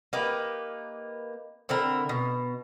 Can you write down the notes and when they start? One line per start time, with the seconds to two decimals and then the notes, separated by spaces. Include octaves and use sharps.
0.13 A#3 D#4 G4 B4
1.69 D3 C4 E4 A#4
2.09 B2